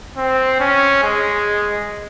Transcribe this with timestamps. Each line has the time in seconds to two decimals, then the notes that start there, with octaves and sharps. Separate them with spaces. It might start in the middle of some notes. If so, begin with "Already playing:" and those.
0.17 C4
0.60 C#4
1.03 G#3